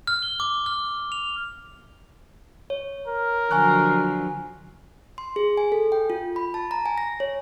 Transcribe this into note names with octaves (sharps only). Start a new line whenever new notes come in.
F6
G7
D6
F6
F7
C#5
A#4
D3 F3 F#3 G#5 C#6 F#6
C6
G#4
G#5
A4
G5
F4
B5
A5
A#5
G#5
A#6
C#5